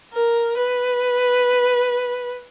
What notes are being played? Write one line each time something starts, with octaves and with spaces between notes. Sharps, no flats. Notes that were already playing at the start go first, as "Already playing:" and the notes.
A#4
B4